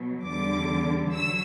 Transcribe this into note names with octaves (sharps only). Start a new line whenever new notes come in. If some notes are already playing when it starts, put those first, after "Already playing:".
Already playing: B2 F#3
E2 D3 G3 D6
F#3 E6